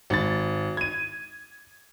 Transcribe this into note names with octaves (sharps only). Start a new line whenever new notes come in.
G#1 A6
G#6 D#7